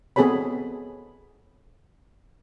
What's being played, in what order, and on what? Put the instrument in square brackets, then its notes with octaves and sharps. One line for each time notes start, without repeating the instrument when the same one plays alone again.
[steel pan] B3 C4 G#4 A4 C#5 B5